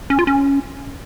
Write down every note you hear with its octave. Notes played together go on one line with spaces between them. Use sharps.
C#4
F4
C#4